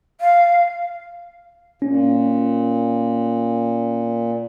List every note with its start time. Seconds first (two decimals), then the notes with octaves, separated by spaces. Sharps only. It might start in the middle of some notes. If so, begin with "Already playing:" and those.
0.21 F5
1.82 A#2 C#4